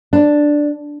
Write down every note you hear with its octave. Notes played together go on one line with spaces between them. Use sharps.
D4